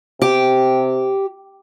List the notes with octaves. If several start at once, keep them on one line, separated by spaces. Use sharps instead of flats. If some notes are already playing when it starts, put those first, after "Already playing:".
C3 G4